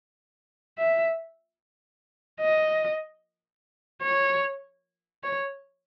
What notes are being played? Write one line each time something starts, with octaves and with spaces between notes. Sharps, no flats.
E5
D#5
C#5
C#5